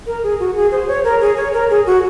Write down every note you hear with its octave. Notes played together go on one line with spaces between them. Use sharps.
A#4
G#4
F#4
G#4
C5
C#5
A#4
G#4
C#5
A#4
G#4
F#4